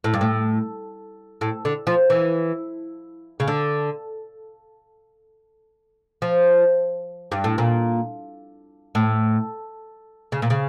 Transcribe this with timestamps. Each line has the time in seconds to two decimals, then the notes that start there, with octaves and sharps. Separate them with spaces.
0.04 A2
0.14 G2
0.21 A2
1.41 A2
1.65 D3
1.87 F3
2.10 E3
3.40 C#3
3.48 D3
6.22 F3
7.32 G2
7.44 A2
7.58 A#2
8.95 A2
10.32 C#3
10.42 A#2
10.50 C#3